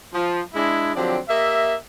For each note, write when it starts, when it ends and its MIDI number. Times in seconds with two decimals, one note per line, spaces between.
0.14 0.41 53
0.54 0.91 56
0.54 0.91 62
0.54 0.91 64
0.96 1.18 50
0.96 1.18 53
0.96 1.18 54
0.96 1.18 60
0.96 1.18 67
0.96 1.18 74
1.29 1.75 58
1.29 1.75 67
1.29 1.75 75
1.29 1.75 76